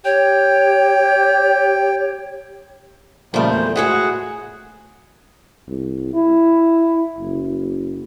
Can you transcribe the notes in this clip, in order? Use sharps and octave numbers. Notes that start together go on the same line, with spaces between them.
G4 C#5 G5
A#2 C#3 F3 G3 A3
E2 C5
A2 G#3 F#4 G#4 F#5
C2
E4
F#1